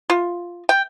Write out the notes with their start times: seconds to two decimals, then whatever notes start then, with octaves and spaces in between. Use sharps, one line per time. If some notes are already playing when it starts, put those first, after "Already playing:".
0.10 F4
0.69 G5